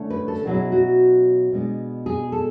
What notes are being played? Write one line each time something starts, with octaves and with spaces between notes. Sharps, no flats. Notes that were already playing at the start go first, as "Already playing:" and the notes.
Already playing: D3 A3 C#4 E4
B4
A4
B2 F#3 C#4 E4 G#4
F#4
B2 G#3 B3 D4
G#4
A4